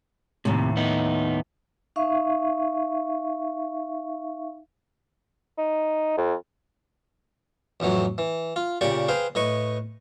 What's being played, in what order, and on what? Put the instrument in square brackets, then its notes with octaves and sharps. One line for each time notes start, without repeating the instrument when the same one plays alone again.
[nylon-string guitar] D#2 A2 [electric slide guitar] C3
[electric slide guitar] B3 D#4
[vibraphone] D#4 E5 F5 C#6
[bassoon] D#4
F2
[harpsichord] A1 F2 E3 F#3
E3
F4
A#2 C#3 G4 D5 C#6
G#4 B4 C5 F5 G5
A2 B4 D#5 C#6